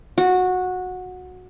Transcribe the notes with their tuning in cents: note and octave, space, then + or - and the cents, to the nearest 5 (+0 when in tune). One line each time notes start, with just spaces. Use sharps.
F#4 -15